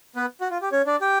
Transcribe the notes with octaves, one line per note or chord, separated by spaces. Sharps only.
B3 B4
F#4
F4
G4
C#4 C#5
D4 D5
G4 G5